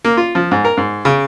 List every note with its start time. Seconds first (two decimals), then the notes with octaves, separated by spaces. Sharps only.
0.05 A#3
0.17 F4
0.35 F3
0.51 G#2
0.65 A#4
0.77 G#2
1.05 C#3